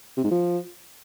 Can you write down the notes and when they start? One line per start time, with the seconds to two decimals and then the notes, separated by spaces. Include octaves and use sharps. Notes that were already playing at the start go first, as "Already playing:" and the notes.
0.17 C3
0.24 G#2
0.31 F3